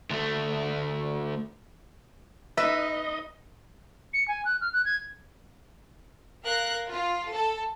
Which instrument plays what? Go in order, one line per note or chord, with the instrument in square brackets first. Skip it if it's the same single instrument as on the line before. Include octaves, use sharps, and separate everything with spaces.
[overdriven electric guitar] D2 A3
[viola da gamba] D#4 [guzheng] B4 [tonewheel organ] D#5 [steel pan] E5
[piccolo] C#7
G#5
F#6
F6
F#6
G#6
[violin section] A#4 F5 F#6
F4
A4